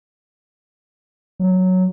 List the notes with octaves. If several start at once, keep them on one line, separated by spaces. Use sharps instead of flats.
F#3